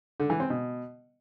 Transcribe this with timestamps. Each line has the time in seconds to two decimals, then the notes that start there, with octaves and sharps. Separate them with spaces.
0.20 D3
0.30 E3
0.40 C4
0.50 B2